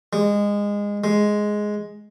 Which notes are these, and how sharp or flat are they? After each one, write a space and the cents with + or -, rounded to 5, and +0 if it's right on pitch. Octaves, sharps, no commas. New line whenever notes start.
G#3 -20
G#3 +5